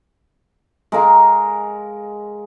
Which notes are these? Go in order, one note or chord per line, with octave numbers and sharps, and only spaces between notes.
G#3 A#4 F5 D6